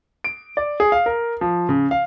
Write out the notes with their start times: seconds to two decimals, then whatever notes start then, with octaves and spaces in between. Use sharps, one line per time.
0.24 D7
0.57 D5
0.80 G#4
0.92 F5
1.06 A#4
1.41 F3
1.69 C#3
1.91 F5